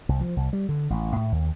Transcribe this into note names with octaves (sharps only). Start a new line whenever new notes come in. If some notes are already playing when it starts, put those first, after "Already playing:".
C2
F3
C2
G3
D3
A1
A2
D#2